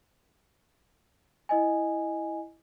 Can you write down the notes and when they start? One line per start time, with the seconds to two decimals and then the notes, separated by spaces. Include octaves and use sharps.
1.49 E4 D#5 G#5